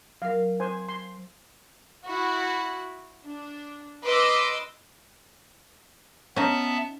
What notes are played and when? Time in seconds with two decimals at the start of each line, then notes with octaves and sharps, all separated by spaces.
0.22 F#3 A#4 F5
0.60 C5 G#5
0.89 C6
2.06 E4 F#4
3.24 D4
4.03 B4 D#5 C6 D6 E6
6.36 B3 C#4 D#4 E5 A5